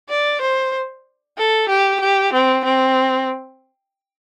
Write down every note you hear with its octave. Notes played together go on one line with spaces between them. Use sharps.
D5
C5
A4
G4
G4
C4
C4